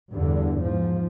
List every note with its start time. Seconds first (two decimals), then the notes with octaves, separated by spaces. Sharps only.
0.12 E2 G2 D3
0.61 G#2 F3